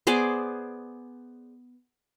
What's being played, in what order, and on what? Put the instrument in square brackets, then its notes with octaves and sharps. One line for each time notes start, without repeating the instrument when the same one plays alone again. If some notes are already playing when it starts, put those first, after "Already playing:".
[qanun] B3 G#4 C5 D5